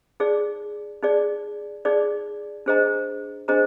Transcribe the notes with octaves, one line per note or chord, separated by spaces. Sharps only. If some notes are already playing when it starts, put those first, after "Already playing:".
D#4 G#4 D5
D#4 G#4 D5
D#4 G#4 D5
D4 G#4 C5 D#5 A#5
D4 G#4 C5 D#5 A#5